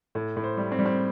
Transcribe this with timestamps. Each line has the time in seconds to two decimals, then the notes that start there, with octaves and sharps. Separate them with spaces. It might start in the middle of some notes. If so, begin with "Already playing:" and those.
0.15 A2
0.36 A2
0.44 C5
0.57 G3
0.72 C4
0.79 G3
0.86 C4